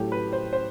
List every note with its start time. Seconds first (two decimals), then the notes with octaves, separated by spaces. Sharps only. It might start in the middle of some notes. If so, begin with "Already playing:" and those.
Already playing: A2 F#3 A3 E4 G4
0.12 B4
0.33 C5
0.53 C5